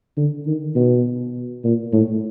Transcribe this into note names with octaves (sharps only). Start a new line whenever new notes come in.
D3
D#3
B2
A#2
A2